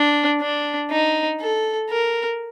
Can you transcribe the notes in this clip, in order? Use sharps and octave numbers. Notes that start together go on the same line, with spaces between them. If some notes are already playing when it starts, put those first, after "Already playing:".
Already playing: D4
D4
D#4
A4
A#4